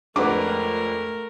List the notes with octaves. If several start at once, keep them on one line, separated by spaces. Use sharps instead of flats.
F2 G#3 A3 D4 A#4 B4 F#5 D6